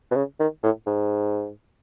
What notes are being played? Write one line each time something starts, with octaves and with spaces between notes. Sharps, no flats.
B2
C#3
D#3
A2
G#2